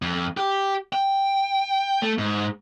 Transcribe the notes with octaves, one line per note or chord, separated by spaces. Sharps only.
F2
G4
G5
A3
G#2